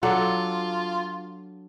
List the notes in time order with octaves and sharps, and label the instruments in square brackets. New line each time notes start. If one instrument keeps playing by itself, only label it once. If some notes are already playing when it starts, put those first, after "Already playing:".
[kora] F#3 D4 A4 [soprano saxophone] F4